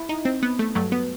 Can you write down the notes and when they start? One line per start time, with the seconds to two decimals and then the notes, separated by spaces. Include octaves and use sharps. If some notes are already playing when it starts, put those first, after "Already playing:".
Already playing: E4
0.09 D#4
0.25 C4
0.43 B3
0.59 A3
0.75 G2 F#3 A3
0.92 B3